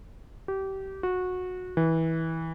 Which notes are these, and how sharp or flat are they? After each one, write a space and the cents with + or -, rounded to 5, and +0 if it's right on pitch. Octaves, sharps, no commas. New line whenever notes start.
G4 -25
F#4 -20
E3 -20